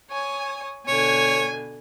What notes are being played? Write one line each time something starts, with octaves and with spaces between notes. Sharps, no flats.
C#5 G#5 D#6
B2 D3 C#5 G#5